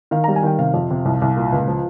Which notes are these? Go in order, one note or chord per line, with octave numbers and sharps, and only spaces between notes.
D#3 F5
G3 A#5
G#5
D#3 G5
C3 F5
F2
C3
C2
C2
A#2
C#2
F3